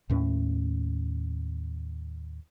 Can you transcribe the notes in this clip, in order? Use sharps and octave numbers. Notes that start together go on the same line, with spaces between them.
D#2 A2 C#4